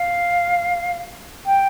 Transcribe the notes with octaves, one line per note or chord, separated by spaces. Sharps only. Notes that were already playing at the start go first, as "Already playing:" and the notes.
Already playing: F5
G5